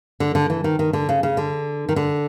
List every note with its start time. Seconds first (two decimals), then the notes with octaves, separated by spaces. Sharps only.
0.20 D3
0.35 D3
0.50 E3
0.64 D#3
0.79 D#3
0.93 D3
1.09 C#3
1.23 C#3
1.37 D3
1.89 D#3
1.96 D3